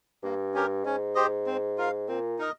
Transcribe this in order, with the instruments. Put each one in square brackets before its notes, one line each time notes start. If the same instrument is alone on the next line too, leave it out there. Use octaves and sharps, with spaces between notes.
[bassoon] G2 [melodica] A#3
[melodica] C#4 G4 A#4
[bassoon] G#2 [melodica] C#4
[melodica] G4 C5 D#5
C4
F4 A#4 F5
[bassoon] A#2 [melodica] C4
[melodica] D#4 A#4 D#5